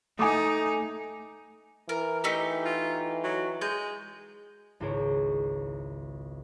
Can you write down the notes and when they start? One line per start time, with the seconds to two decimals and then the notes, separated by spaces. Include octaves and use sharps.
0.19 A3 D#4 G#5 D6 D#6
1.89 E3 A#4
2.24 A3 D#4 G4
2.65 F4
3.24 F#3
3.61 G#3 G6
4.80 G#1 C#2 E4 C5 C#5 D7